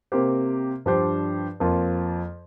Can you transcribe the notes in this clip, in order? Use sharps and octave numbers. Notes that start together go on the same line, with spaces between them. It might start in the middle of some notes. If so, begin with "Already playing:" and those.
C3 A#3 G4 C5
G2 F3 D4 G4 C5
F2 F3 A#3 F4